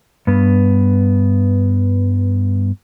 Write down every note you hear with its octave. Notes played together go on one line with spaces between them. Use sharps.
G2 B3